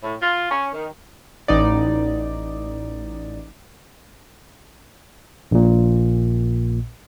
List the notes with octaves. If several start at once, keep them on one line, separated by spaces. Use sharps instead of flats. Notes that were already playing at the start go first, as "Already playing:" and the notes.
A2
F4
C#4
D#3
A1 D#4 D5
A#1 A#2